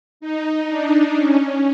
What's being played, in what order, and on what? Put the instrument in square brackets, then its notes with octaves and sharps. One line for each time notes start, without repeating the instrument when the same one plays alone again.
[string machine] D#4
D4
C#4